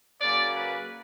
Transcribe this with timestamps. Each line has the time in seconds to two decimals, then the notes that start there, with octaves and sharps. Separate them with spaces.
0.21 C#3 F#3 A#3 D5
0.55 B4